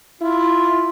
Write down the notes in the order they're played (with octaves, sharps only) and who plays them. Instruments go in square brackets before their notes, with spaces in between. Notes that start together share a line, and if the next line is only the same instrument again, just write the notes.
[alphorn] E4 [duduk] F4